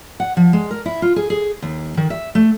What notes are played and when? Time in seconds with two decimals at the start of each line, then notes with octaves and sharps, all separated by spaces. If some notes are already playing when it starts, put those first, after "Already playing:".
0.20 F#5
0.37 F3
0.53 G#3
0.71 A#4
0.86 E4
1.02 F4
1.16 G#4
1.30 G#4
1.62 D#2
1.97 D#3
2.10 E5
2.35 A3